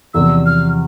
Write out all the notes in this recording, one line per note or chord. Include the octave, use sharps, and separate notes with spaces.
E2 C3 F3 E6
F6